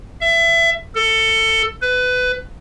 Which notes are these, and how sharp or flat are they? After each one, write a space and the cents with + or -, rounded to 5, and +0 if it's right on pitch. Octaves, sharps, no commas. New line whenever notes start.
E5 +25
A4 +20
B4 +20